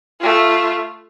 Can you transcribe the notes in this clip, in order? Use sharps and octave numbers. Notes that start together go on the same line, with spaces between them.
A3 F4